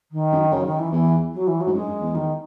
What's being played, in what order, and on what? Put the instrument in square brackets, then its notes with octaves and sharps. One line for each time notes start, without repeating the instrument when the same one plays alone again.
[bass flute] D#3
[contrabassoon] F#2
[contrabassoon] F#2 [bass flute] C#3
[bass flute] D#3
E3
[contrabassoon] E2 [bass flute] E3
[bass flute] F#3
E3
F#3
[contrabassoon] G#2
[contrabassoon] F#2 [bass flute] G#3
[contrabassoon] F#2
E2
[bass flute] D#3